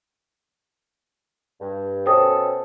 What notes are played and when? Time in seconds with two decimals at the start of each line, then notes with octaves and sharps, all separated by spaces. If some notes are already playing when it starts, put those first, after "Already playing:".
1.60 G2
2.06 B2 C#4 A4 C5 G5 D#6